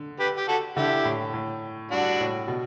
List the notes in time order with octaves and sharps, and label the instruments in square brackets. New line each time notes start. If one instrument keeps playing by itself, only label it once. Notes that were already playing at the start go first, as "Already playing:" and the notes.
Already playing: [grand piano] D3
[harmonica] G4 B4
G4
F#4 A4
[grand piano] D3 [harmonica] E4 G4
[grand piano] A2
A2
[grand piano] G2 [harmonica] D4 F#4
[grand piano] A2
B2